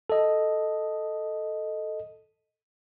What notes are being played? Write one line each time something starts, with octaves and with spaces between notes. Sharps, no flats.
A4 D#5